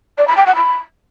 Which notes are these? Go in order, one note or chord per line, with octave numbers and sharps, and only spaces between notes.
D5
B5
G5
F#5
B5